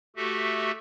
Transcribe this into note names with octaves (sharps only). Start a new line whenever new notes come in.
A3 F#4 G4 A4 E5